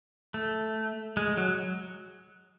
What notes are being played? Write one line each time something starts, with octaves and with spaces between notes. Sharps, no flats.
A3
G#3
F#3